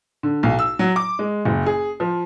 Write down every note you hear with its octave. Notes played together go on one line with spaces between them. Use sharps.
D3
B1
E6
F#3
D6
G#3
F#1
G#4
F3